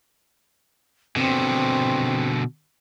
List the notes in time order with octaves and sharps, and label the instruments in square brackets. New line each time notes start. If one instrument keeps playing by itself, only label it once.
[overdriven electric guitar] B2 D3 [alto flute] C4